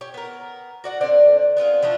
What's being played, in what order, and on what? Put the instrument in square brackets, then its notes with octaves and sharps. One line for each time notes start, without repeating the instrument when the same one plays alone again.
[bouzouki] G4 C#5
B3 A#4
F#4 D5 F#5
D3 C4 D5
B3 C4 F4 G#4
E3 F3 A3 D4